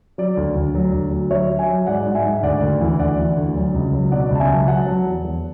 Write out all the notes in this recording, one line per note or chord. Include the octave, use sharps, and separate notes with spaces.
F#3 D5
D2
D2
F#3
D2
F#3
F#3 C#5 E5
F#3
E5 G#5
F#3
G#2 D5 F#5
G#2
E5 G#5
G#2
D2 D5 F#5
D2
E3
D2 D5 F#5
E3
D2
F#3
C#2
F#3
B2 D5 F#5
C#2 A5
E5 G#5
F#3
F#3 F#5 A5
F#3
E2
E2